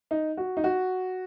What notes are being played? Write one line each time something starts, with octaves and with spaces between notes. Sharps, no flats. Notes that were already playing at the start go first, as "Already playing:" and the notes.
D#4
F#4
D#4
F#4